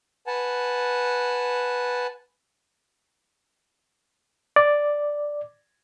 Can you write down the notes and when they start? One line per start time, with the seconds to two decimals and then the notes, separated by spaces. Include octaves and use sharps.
0.27 B4 F#5 G#5 A5
4.56 D5